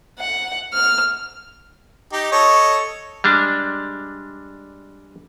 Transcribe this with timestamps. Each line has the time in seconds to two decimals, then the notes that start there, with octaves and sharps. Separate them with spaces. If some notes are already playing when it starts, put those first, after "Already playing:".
0.19 F#5
0.73 F6
2.13 D#4 G4
2.32 A4 C#5 D#5
3.24 G3 G#3 D4